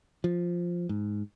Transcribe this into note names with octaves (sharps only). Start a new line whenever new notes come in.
F3
G#2